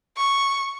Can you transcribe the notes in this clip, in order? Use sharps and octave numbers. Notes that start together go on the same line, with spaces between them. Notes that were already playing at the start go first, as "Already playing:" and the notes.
C#6